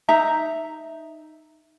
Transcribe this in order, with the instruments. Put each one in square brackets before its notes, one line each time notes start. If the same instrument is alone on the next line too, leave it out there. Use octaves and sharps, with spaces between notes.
[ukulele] D#4 E5 A#5